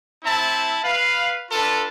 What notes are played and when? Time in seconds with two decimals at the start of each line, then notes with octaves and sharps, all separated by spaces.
0.23 C4 E4 E5 A5
0.83 B4 F5
1.51 D4 F4 A4 B4